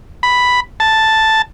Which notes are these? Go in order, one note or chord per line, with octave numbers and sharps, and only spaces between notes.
B5
A5